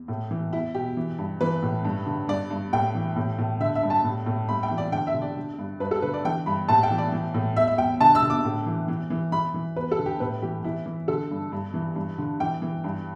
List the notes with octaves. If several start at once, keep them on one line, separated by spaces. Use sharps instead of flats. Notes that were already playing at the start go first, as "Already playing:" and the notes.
Already playing: E2
A2
E3
E2 E4
B2 G4
E3
G2
E3 B4
A2
G2
D3
G2 D5
G2
A2 G5
E3
A2
A2
D3 E5
E5
G2
A5
A2
A2
G2 B5
G5
E3
D5
D3 G5
E5
D3
D5
D3
G2
G2 B4
A4
D3 B4
D5
E3 G5
G2 B5
A2 A5
G5
E3
D5
E3
A2
E2 E5
E5
E2 G5
D3 A5
E6
D3
D6
A2
E3
E3
E3
E3 B5
E3
E2 B4
A4
D3
G4
A2 B4
E3 G4
E3 E4
E3
D3 A4
G2
G2
E3
G2
D3
E3 G5
E3
G2